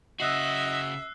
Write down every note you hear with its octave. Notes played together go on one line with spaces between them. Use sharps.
C#3 F#4 D#5 E5 E6 F#6 C7